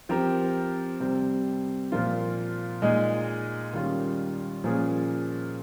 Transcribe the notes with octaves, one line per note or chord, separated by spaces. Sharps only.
F3 C4 G4 A#4
C3 G3 C4
A#2 F3 A#3 F4
A#2 G#3 D#4 G#4
D#3 G3 C#4 F4
A#2 F3 A#3 C#4 G#4